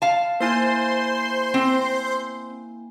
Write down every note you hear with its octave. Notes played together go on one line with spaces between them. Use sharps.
F5 A5
A#3 E4 C5 G#5 C6
C4